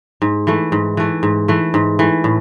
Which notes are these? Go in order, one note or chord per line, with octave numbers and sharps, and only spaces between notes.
G#2
E3 A3
G#2
E3 A3
G#2
E3 A3
G#2
E3 A3
A2